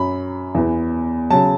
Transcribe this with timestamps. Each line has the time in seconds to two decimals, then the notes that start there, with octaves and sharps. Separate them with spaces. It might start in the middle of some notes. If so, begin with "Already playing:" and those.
Already playing: F#2 F#3 B5
0.55 E2 E3
1.30 C#3 F#3 A5